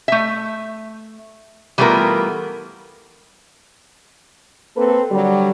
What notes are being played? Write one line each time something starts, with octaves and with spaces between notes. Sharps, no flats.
A3 E5
E3 G3 A3 B3 F4 A#4
A#3 C4 A4 B4
D3 F#3 G3